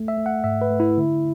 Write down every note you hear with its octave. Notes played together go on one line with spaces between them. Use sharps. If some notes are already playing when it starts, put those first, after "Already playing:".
Already playing: A3
E5
A3
F#5
G#2 E5
B4
A3
E4
D3